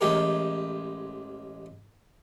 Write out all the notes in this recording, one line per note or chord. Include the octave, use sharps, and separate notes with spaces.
A1 G#3 G4 A#4